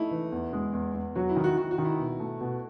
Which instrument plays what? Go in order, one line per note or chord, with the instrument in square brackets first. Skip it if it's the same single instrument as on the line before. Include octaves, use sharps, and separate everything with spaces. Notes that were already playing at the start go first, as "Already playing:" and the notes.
Already playing: [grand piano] A3 [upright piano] D#4 E4
[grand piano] E3
E2
G#3
E2
E2
[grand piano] F#3 [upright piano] F#4
[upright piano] E4
[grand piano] D#3
[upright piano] F#4
[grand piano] D#3 [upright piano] F#4
[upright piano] F#4
[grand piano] D#3
[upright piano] E4
[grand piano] B2
A3
B2